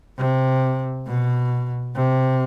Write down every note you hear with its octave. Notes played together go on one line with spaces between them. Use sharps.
C3
B2
C3